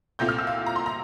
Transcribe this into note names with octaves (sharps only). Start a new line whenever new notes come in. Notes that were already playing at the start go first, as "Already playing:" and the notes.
C2 A#2 A3 C4 F4 G6
F6
E6
F5
A#5
C6
A#5